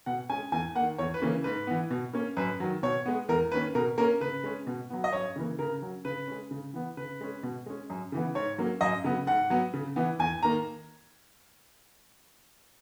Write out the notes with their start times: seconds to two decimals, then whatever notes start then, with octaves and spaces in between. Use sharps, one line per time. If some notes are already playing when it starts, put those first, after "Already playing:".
0.06 B2 F#5
0.30 G#3 C#4 G#5
0.52 E2 G#5
0.75 A#3 F#5
0.80 D#3
0.98 E2 C#5
1.14 B4
1.22 C#3 E3 A#3 C#4
1.44 G#2 B4
1.67 E3 B3
1.91 B2
2.13 A#3 C#4
2.37 F#2 B4
2.60 D#3 F#3
2.83 B2 C#5
3.05 G#3 B3
3.28 E2 A#4
3.52 D#3 A#3 C#4 B4
3.75 B2 A#4
3.98 A#3 C#4 A#4
4.20 C#3 B4
4.44 G#3 C#4
4.67 B2
4.90 F#3 B3
5.04 D#5
5.12 F#2 C#5
5.36 C#3 E3 A#3
5.59 C#3 A#4
5.82 F#3 C#4
6.05 C#3 B4
6.28 G#3 C#4
6.51 C#3
6.73 E3 B3
6.97 C#3 B4
7.21 G#3 C#4
7.43 B2
7.66 G#3 C#4
7.90 F#2
8.12 C#3 E3 B3
8.35 G#2 C#5
8.58 F#3 A#3 C#4
8.81 F#2 D#5
9.04 C#3 F#3 B3
9.27 G#2 F#5
9.50 F#3 B3
9.74 C#3
9.96 E3 B3
10.19 E2 G#5
10.43 D#3 A#3 A#5